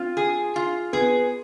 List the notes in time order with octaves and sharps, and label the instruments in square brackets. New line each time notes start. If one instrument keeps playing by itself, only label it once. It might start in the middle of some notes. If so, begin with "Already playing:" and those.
Already playing: [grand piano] C4 [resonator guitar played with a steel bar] F4
[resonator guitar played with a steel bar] G#4
F4
[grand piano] B3 [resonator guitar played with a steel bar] G#4